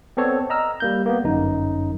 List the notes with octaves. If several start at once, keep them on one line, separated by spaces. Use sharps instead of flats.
B3 C4 A4 C#5 D5
D#5 A#5 E6 F6
G3 A#3 G6
A#3 B3
G1 F#2 D#4